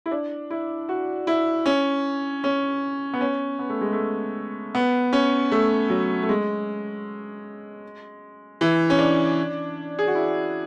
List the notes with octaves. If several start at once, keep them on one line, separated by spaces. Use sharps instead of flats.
E4
D4
E4
F#4
E4
C#4
C#4
B3
C#4
B3
A3
G#3
A3
B3
C#4
A3
F#3
A3
G#3
E3
C#4
D4
G#4
F#4
E4